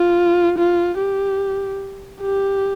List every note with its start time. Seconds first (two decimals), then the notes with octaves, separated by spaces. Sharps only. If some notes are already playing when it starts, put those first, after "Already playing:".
Already playing: F4
0.58 F4
0.99 G4
2.22 G4